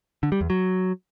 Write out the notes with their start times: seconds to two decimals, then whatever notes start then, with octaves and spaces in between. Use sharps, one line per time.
0.23 D3
0.32 G3
0.41 E2
0.50 F#3